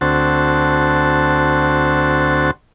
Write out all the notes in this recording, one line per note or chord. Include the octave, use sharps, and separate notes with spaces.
D2 C4 F#4 A5